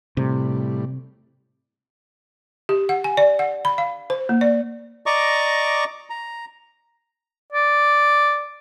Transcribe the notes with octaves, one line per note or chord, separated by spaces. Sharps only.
A2 C3 G3
G4
F#5
G#5
D5
F#5
B5
F5
C5
A#3
D5
D5 D#5 A#5 C#6 D6
A#5
D5